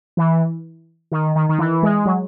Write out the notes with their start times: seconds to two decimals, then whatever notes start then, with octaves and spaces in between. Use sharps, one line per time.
0.17 E3
1.12 D#3
1.35 D#3
1.49 D#3
1.58 E3
1.83 G#3
2.05 F#3